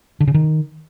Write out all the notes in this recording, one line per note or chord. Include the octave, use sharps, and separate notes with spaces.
D3
C#3
D#3